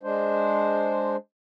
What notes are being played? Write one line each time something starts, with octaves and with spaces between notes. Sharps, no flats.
G#3 D4 C5